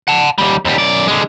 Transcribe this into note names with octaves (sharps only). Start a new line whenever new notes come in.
F#5 A5
D#2 G3
D#2 G3
F#2 D5
D3 G#3